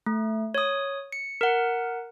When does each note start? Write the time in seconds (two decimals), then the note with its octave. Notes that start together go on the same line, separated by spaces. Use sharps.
0.06 A3
0.55 C#5 D#6
1.12 C#7
1.41 A#4 F#5